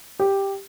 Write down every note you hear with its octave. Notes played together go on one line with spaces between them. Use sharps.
G4